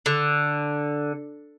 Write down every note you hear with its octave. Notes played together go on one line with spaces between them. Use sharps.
D3